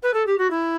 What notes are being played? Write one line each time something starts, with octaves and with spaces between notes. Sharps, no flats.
B4
A4
G4
F#4
E4